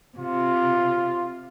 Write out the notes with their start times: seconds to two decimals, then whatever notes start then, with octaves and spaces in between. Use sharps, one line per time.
0.18 C3 F4